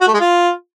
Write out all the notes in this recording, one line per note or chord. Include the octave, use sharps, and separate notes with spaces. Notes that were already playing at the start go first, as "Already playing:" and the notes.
F#4
A3
G#3
F4